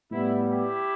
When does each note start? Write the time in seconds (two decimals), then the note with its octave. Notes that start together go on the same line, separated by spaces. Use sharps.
0.11 A2 G3 B3 E4
0.48 E4 G4